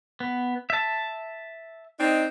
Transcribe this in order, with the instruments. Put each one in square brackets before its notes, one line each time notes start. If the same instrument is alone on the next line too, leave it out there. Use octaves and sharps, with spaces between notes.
[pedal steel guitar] B3
E5 A5
[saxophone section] C4 D4 D#4